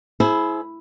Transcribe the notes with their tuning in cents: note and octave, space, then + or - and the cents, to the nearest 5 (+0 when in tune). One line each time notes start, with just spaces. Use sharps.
E4 +0 G#4 +35 C5 +0